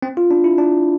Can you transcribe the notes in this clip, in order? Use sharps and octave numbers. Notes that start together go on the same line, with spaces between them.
C4
F4
D4
E4
D4